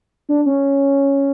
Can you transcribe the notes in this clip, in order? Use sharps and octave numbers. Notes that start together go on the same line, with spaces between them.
D4
C#4